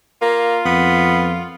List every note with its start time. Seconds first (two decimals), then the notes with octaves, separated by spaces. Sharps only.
0.22 A#3 F4
0.65 F2 B3